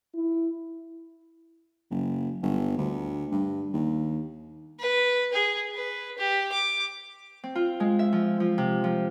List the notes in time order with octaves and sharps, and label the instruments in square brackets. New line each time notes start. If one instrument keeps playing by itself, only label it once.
[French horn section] E4
[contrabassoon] F#1
G1
D2
G2
D#2
[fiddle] B4
G#4
B4
G4
D6
[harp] C4
F4
G#3
E5
F3
F3
C3
F3